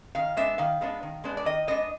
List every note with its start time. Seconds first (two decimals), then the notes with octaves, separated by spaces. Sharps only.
0.15 D#3 F5
0.37 G#3 B3 D4 E5
0.58 D#3 F5
0.81 G#3 B3 D4
1.03 D#3
1.24 G#3 B3 D4
1.37 D5
1.45 D#3 D#5
1.67 G#3 B3 D4 D#5